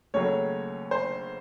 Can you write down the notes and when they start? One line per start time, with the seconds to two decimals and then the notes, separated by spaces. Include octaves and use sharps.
0.14 D#2 C#3 F#3 A3 C#5
0.91 C5